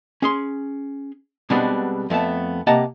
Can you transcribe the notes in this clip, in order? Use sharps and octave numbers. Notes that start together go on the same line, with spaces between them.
C#4 G#4 C6
B2 G3 G#3 B3 C4 D4
F2 A3 B3 A5
C3 A#3 D#5 F#5 A5 A#5